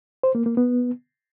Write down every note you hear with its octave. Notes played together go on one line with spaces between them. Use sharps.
C5
A#3
A#3
B3